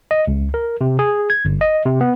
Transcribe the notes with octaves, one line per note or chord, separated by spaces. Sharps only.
D#5
C#2
A#4
C3
G#4
G#6
G1
D#5
C3
B3